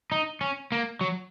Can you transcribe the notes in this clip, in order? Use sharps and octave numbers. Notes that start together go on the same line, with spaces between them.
D#4
C#4
A#3
F#3